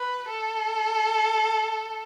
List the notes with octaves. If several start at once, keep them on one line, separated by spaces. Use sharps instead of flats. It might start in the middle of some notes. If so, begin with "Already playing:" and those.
Already playing: B4
A4